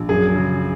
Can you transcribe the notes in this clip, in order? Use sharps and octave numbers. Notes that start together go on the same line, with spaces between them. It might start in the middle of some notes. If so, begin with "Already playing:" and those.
Already playing: A#1
F#2 G#4
C#3